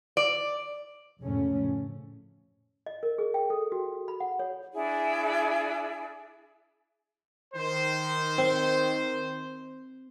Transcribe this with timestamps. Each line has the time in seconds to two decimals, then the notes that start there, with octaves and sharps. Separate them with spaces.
0.17 D5
1.20 F1 A2 C#3 F3 A3 C#4
2.86 D#5
3.03 A#4
3.18 G#4
3.34 G5
3.50 A4
3.72 F#4
4.08 B5
4.20 F#5
4.39 C#5
4.74 D4 E4 G#4
7.54 D#3 C5
8.38 C4